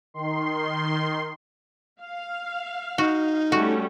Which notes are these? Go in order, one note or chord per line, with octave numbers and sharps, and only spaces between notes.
D#3 C6
F5
D#4 F#4
G3 A3 C#4 F#4